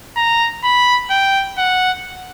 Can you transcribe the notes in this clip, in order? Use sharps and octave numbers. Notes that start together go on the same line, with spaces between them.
A#5
B5
G5
F#5